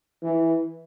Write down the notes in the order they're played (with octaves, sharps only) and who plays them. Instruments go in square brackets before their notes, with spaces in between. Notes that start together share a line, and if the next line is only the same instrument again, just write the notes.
[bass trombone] E3